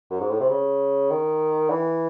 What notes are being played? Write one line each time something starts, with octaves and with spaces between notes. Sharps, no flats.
F#2
G#2
A2
C3
C#3
D#3
E3